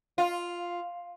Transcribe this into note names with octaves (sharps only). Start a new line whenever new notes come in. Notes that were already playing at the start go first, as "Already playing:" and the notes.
F4